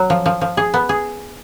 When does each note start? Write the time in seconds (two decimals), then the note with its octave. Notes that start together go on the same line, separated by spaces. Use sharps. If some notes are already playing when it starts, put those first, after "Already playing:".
Already playing: F#3
0.10 F3
0.26 F3
0.41 F3
0.57 G#4
0.74 B3
0.89 G#4